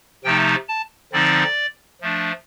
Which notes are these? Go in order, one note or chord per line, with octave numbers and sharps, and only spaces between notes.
C3 F3 A3 D#4 G5
A5
D3 F3 C4 D#4 D5
F3 A3 D4